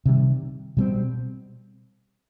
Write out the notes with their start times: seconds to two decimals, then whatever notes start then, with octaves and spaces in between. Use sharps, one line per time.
0.06 C3 D#3 G3
0.77 B2 G3 C4